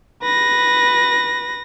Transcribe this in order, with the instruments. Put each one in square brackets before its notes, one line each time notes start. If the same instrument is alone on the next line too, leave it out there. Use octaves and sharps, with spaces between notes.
[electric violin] B4 A#6